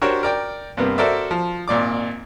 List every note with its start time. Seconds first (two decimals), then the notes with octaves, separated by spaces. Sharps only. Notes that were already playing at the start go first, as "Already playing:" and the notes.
0.01 D4 F#4 G4 A#4 C5 C#5
0.23 A#4 D5 G5
0.77 G2 C3 A#3 B3
0.98 F#4 A4 A#4 C5 D5 E5
1.31 F3
1.68 G#1 A#2 D5 D6